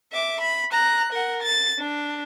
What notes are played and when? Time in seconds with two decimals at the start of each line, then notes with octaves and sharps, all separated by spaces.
0.12 E5 D6
0.41 B5
0.72 A#5 F#6
1.13 A#4 F#5
1.43 A6
1.79 D4